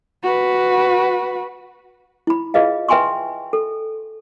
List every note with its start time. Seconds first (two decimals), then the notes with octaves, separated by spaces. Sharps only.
0.24 F#4 B4
2.27 E4 B5
2.54 F4 G#4 B4 D#5 F5
2.88 B4 E5 G5 G#5 C6 C#6
3.53 A4